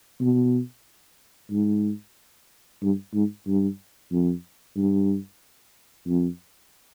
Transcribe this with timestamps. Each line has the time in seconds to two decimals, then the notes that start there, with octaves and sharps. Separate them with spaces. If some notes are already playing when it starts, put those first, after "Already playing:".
0.21 B2
1.51 G#2
2.82 G2
3.14 G#2
3.47 G2
4.12 F2
4.77 G2
6.07 F2